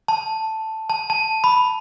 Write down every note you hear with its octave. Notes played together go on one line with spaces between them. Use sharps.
A5
A5
A5
B5